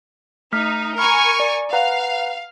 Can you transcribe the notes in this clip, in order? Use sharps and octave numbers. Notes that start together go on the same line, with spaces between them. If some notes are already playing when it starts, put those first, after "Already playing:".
A3 D#4 F6 B6
A#4 G#5 A#5 B5 C#6 F6
D5
B4 F5 F#5 A#5